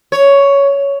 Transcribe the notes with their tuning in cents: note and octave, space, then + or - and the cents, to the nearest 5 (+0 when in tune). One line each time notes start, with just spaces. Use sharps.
C#5 +10